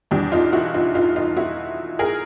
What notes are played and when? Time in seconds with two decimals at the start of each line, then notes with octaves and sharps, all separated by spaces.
0.11 E2 B2 G3 D4
0.32 D#4 F4
0.53 E4 F#4
0.74 D#4 F4
0.95 D#4 F4
1.16 D#4 F4
1.37 E4 F#4
1.99 G#4 A#4